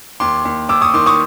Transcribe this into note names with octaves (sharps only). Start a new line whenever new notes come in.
D#2 C6 D6
D#2
D#2 D6 E6
C#6 D#6
D#3 C6 D6
C#6 D#6